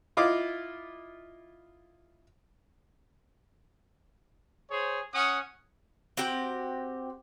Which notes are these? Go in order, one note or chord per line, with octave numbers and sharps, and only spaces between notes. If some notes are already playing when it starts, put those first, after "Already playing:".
E4 F4 D#5 D6
G#4 C5 C#5
C#4 F#5 D#6
C4 F#4 G4 G5